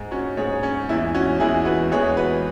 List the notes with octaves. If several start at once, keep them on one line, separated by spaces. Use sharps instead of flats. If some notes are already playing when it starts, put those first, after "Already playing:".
Already playing: G#2 G#3
C#4 F#4
G#2 G#3 G#4 C#5
C#4
E2 E3 G#3 E4
C#4 F#4
E2 E3 G#3 E4 G#4
F#4 B4
E2 E3 G#3 G#4 C#5
F#4 B4